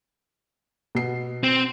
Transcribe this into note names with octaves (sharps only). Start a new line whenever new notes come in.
B2 C7
C4